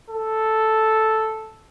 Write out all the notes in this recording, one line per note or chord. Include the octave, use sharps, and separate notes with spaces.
A4